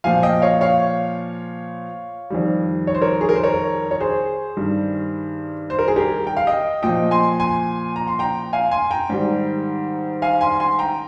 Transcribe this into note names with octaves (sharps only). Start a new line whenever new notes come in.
A#2 F3 F5 G#5
D#5 G5
C#5 F5
C#5 F5
F2 D#3 G3
C#5
C5
A#4 C#5
G#4
A#4
C5
A#4 C#5
C#5
G#4 C5
G2 D#3 G3
C5
A#4
G#4
G4 A#4
G5
F5
D#5 G5
A#2 F3 D#5 G5
G#5 C6
G#5 C6
A#5
C6
G5 A#5
F5 G#5
G#5 C6
G5 A#5
G#2 D#3 G3
F5 G#5
G#5 C6
G#5 C6
G5 A#5